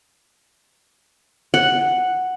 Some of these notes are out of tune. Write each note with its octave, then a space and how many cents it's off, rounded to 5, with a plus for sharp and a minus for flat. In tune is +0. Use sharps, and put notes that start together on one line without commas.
F#5 +0